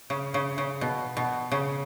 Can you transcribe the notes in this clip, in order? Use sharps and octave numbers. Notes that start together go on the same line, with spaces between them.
C#3
C#3
C#3
B2
B2
C#3